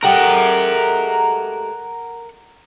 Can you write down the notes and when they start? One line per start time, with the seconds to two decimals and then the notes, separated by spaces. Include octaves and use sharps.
0.03 G#3 A3 G4 A#4 F#5